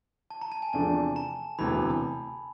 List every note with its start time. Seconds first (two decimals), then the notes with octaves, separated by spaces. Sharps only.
0.30 A5
0.41 A#5
0.52 A5
0.62 G#5
0.73 E2 C3 F3 A3 D4 A5
1.16 A#5
1.59 E1 D2 C3 E3 B5